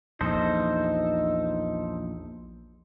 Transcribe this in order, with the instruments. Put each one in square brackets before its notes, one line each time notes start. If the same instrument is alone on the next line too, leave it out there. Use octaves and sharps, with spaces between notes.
[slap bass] A#1 E2 [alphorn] D#4 [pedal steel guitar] A4 C5 D#5